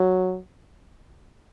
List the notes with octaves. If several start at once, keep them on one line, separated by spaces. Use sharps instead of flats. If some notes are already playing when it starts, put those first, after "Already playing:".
Already playing: F#3